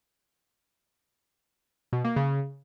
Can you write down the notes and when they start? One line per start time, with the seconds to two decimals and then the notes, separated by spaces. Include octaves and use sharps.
1.93 B2
2.04 A#3
2.16 C#3